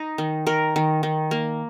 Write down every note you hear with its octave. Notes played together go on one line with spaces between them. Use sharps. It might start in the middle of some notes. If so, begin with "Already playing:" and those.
Already playing: D#4
D#3
D#3 A#4
D#3
D#3
A#3